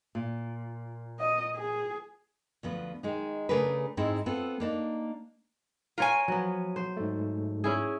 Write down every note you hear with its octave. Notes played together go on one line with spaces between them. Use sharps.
A#2
D#5
G#4
D2 F3 B3
D#3 G#3 D#4
C#3 A3 D4 G#4 A#4 B4
G#2 G#3 C4 D#4 E4
B3 C4 F4 A4
A#3 D4 D#4
F4 A#4 C#5 G#5
F3 F#3 B3
C5
G#2 A3
C#4 E4 G#4